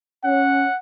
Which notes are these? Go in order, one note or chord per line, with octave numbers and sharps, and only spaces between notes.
C#4 F#5